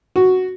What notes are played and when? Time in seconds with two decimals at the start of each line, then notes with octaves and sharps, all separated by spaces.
0.16 F#4